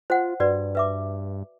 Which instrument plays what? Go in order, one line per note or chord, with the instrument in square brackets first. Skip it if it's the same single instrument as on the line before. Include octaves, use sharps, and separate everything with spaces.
[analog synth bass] F4 [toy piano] C5 F#5
[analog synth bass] G2 [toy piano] F#4 B4 D5
[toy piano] B4 E5 D6